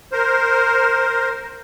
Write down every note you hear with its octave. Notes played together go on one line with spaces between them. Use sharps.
A#4 C5